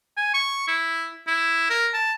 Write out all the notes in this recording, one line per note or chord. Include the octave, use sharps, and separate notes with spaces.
G#5
C#6
E4
E4
A#4
A5